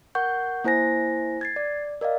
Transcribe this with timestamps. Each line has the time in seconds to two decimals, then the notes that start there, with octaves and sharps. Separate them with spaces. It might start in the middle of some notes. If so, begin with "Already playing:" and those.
0.15 A#4 F#5 C#6 G6
0.64 A#3 E4 C5 G#5 A#6
1.41 G#6 A6 C7
1.56 D5
2.01 A#4 D5 D#5 F5